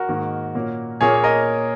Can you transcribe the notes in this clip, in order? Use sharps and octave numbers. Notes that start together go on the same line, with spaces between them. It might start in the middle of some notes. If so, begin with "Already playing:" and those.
Already playing: F#4 A#4
G#2 D#3 A#3
A#2 A#3 C#4
A#2 A#3 C#4 G#4 C#5
C#5
A#4 D#5